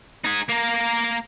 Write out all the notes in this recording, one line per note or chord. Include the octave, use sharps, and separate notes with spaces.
D#4 G#4
A#3 A#4